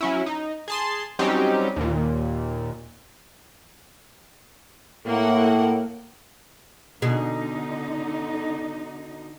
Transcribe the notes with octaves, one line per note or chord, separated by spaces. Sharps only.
F#3 C#4 E4
D#4
G#4 A5 C6
F#3 G3 C4 C#4 D#4 G4
D#2 A#2
A2 A#3 F#5
B2 D3 D#4 G#4